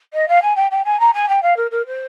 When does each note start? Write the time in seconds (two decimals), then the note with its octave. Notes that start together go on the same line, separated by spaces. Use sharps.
0.13 D#5
0.28 F5
0.42 G#5
0.55 G5
0.71 G5
0.84 G#5
0.99 A#5
1.13 G#5
1.28 G5
1.42 F5
1.56 A#4
1.70 A#4
1.86 C5